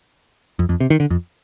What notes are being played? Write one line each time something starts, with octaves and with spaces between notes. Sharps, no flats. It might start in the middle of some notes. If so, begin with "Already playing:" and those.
F2
F2
C3
D#3
D3
F2